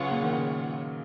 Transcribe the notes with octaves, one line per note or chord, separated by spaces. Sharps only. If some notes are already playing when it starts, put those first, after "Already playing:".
Already playing: C#3 F#3 B3 F4 G#4 C#5 F#5
A#2
D#3
C#3